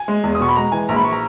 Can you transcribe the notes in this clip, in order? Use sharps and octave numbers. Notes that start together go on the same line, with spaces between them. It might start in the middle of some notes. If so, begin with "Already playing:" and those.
Already playing: G#5
G#3
E2
D#6
B2 C#6
B5
G#3 A#5
E3 G#5
A#1 A#5
B5
C#6
A#5